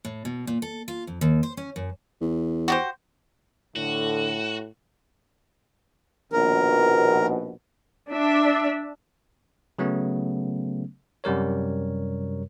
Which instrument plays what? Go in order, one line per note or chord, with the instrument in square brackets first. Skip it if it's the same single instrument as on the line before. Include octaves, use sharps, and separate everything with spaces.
[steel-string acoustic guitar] A2
B2
A#2
A4
F4
F2
D#2
C5
C#4
F#2
[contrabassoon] E2
[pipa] F#4 G4 C5
[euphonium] A2 [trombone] D3 [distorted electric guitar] F#4
[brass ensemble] A#1 D#2 B2 [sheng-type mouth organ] A#4
[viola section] D4 E5
[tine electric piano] C#3 F#3 A3 B3 C#4
F#2 C3 G3 A#4 C#5